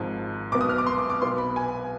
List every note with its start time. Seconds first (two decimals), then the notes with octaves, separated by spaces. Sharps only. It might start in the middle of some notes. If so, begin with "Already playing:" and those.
Already playing: G#1 G#2 F3
0.52 B1 B2 B3 D6
0.61 D#6
0.69 F6
0.78 D6
0.86 C6
0.98 D6
1.10 D6
1.21 B1 B2 B3 C6
1.38 B5
1.56 G#5